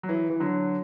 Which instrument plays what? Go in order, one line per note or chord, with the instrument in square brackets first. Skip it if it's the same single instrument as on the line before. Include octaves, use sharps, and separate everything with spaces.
[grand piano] F#3
E3
E3
D3 F#3